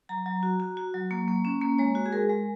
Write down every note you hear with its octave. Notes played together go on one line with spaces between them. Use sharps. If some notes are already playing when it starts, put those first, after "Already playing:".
F#3 A#5
F#3
F#4
F#4
F#4
F#3
A#3
A#3
C#4
A#3
G#3 C#5
F#4
G#4
G#3 A#4
G#3